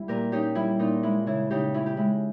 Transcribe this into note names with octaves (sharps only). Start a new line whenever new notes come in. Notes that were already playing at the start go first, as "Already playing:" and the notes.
Already playing: G3 E4
A#2 G4 A#4
C#4 D#4 G4
G3 E4
A#2 D#4
G#3 E4
C#3 E4
C#3 D#4 G4
C#4 E4
G4
G#3 E4